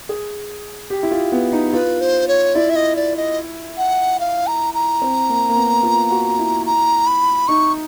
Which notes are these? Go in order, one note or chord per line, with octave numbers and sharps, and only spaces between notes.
G#4
G4
E4
F4
B3
D#4
F4 B4
C5
C#5
E4 D5
E5
D#5
D5
D#5
F#5
F5
A#5
A#5
C4
A#3
A#3
B3
F4
F#4
E4
A#5
B5
D#4 C#6